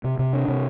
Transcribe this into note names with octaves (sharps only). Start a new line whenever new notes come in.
C3
C3
D4
C3